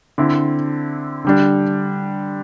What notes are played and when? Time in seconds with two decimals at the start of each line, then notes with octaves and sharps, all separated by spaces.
0.18 D3 C4 E4
1.25 D3 G3 D4